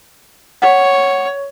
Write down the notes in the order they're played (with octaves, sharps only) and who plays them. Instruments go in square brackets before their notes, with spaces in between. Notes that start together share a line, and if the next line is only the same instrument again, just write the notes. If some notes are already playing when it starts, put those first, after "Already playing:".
[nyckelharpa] C#5 [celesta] F#5